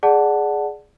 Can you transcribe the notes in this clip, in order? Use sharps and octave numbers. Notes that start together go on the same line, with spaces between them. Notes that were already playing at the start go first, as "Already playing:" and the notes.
G#4 D5 F#5 A5